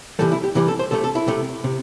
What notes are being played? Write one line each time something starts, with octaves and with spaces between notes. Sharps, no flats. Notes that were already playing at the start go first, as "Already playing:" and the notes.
C3 E3 G3 A4
E4
G4
C3 E3 G3 E4
A4
C5
C3 A3 A4
A4
E4
C3 A3
C3